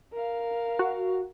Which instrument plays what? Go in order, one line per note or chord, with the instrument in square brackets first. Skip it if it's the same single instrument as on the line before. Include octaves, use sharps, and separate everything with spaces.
[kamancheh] A#4 F5
[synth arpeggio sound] F#4